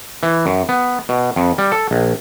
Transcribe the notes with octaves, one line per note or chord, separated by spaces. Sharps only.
E3
F#2
B3
B2
F2
G3
A4
A#1